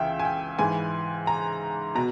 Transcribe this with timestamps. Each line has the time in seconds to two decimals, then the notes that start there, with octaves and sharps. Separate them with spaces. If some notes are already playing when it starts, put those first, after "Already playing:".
Already playing: C#2 E3 E5 G5
0.19 G#5
0.25 G5
0.59 G#2 E3 G#5
1.27 A#5
1.95 B2 A#5